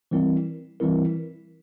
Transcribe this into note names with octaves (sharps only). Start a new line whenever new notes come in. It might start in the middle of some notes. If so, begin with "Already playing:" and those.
E3 G3 C4 E4 A#4
E3 G3 C4 E4 A#4